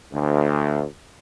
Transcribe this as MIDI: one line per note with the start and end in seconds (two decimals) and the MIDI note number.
0.12 0.85 38